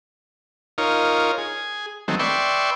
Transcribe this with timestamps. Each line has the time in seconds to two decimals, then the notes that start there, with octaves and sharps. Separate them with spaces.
0.78 D#4 F4 A#4 C#5
1.38 G#4
2.08 D#3 F#3 G#3 A3 C4
2.19 B4 D5 E5 G5 C6 C#6